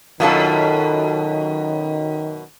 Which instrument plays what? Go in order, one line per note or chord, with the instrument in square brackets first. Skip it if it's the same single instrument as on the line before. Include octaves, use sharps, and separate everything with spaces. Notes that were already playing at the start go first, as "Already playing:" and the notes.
[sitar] F#2 B2 [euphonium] D#3 [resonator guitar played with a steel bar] F#3 F4 A4